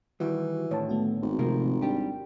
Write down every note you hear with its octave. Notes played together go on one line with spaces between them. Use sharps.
D#3 E3 G3 F#4
A2 D3 D#3 C#5 A5
A3 B3 F#4
G#1
C3 F3 A3 A#4
G3 D4 G4